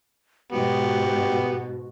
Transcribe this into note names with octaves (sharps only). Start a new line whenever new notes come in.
G#2 B2 B3 F#4 G4